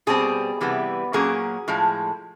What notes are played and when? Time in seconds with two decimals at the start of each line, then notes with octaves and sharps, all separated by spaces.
0.07 B2 G3 C4 G#4
0.61 C3 E3 G3 B3
1.13 A#2 F#3 A#3 C#4 G#4
1.68 A2 F3 G#3